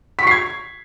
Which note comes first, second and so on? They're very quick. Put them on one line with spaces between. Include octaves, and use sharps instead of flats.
B6 C#6 C7 G#6